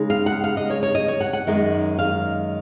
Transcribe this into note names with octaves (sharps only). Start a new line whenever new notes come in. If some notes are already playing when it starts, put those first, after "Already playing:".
Already playing: C#3 G#3 D#4
F5
F#5
F5
D#5
C#5
C#5
D#5
C#5
F#5
F#5
F#2 D#3 G#3 D#4
F5